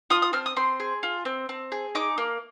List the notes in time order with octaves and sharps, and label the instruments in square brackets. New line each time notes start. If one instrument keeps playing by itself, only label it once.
[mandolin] F4 D#6
D#6
C4 F6
D#6
C4 C6
G#4
F4
C4
C4
G#4
D#4 D6
A#3